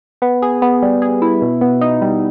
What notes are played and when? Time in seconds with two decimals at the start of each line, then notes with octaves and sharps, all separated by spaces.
0.22 B3
0.42 G#4
0.62 B3
0.82 G3
1.02 G#4
1.22 E4
1.42 B2
1.61 B3
1.81 D#4
2.02 G3